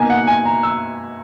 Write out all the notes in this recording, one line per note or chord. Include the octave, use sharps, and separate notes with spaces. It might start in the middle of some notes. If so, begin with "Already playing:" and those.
Already playing: B2 A#3 D#4 G#5
F#5
G#5
A#5
E6